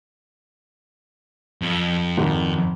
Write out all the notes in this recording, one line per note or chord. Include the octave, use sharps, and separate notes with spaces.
F2
G#1